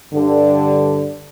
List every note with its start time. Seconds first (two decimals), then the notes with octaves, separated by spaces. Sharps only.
0.14 G2 D3